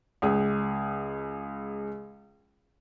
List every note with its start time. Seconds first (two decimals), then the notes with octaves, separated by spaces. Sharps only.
0.22 C#2 G#4